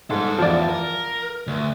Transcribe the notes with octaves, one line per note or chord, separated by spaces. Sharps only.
G#2 G3 A4
E2 F3 D5
A#4
D2